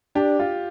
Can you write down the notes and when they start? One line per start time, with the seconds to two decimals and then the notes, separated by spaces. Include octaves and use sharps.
0.15 D4 G4
0.39 F4